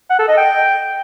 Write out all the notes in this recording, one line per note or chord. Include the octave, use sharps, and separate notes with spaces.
F#5
A4
D#5
G5